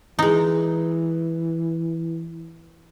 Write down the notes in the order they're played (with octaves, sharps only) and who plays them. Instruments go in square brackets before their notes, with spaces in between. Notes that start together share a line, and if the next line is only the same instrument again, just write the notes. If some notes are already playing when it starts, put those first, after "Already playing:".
[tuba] E3 [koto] G#3 D#4